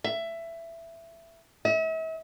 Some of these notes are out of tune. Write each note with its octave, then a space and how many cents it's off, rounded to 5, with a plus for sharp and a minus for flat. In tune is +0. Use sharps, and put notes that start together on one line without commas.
E5 +15
E5 -40